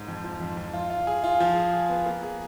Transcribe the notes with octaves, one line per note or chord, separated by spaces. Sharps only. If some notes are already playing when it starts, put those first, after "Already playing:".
Already playing: G#2
F2
F3
F2
F2
F4
F4
G#4
F4
F3
G#4
G#4
B3
A#3
G#4